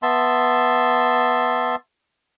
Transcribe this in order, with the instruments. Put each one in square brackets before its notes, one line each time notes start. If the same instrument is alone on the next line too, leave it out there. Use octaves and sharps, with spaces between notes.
[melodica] B3 E5 A5 C6